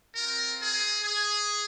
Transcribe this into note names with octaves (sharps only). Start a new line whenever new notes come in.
C4 F4 A#4
G#4
G#4